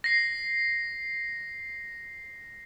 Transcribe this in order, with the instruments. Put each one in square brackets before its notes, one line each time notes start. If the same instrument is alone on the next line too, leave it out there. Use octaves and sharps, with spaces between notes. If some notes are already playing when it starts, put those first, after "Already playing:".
[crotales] A#6 C7